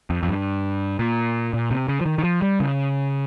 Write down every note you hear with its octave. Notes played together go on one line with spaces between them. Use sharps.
F2
F2
G2
A#2
A#2
C3
C#3
F3
D#3
D#3
F3
G3
C#3